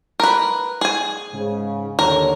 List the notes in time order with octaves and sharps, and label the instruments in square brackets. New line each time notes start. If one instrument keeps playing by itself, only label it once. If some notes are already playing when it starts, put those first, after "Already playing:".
[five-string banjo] A#4 B4
G#4 G#5
[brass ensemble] G#2 C#3
[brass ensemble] D#2 D3 C#5 [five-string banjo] A#4